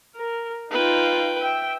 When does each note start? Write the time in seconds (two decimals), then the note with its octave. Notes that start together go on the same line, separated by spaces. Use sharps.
0.16 A#4
0.71 D#4 F4 B4 G5
1.41 E5 G5